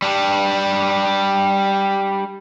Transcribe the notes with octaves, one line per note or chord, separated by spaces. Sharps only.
G3 D4